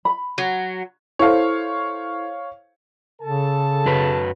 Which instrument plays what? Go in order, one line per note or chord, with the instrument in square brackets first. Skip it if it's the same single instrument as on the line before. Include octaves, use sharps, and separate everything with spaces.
[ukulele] B5
[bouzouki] F#3
[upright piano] E4 A4 C5 [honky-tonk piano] C#5 F5
[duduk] C#3 [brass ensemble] A4 A5
[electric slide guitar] F#2 F#3 B4